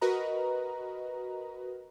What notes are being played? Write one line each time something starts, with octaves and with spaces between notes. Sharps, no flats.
F#4 A#4 B4 D#5 A#5